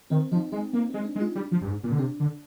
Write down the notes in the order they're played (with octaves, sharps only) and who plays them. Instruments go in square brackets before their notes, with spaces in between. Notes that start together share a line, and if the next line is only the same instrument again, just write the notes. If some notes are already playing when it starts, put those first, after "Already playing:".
[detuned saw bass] D#3 [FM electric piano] C4
[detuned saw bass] F3 [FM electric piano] D#4
[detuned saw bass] G#3 [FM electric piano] D#4
[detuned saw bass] A#3 [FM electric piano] C4
[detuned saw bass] G#3 [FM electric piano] C4
[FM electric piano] D4
[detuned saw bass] G#3
[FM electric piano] F4
[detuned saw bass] G3 [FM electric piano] D4
[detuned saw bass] F3
G2
G#2
A#2
D3
[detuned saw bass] C3 [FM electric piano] D4
[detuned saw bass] D3